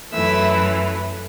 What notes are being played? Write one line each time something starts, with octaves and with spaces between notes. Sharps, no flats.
F#2 E3 A3 E5